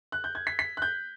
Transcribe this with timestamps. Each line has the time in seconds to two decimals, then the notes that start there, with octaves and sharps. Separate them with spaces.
0.12 F#6
0.24 G6
0.35 G#6
0.47 B6
0.59 B6
0.77 F#6
0.82 G6